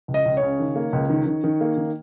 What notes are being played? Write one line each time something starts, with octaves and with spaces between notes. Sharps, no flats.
C#2
D#5
C#2
C#5
C#3
D#3
A#3
C#2
D#3
D#3
D#3
A#3
D#3